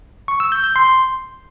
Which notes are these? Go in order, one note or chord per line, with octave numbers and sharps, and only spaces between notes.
C#6
E6
G6
G6
C6